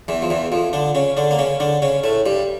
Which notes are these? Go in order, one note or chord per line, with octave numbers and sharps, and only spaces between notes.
E2 E3
F3
E2 E3
F2 F3
D3 D4
C#3 C#4
D3 D4
A#3
C#3 C#4
D3 D4
C#3 C#4
A2 A3
G2 G3